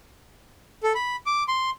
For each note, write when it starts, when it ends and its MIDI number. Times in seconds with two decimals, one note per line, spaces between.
0.83 0.93 69
0.95 1.16 83
1.26 1.44 86
1.48 1.70 84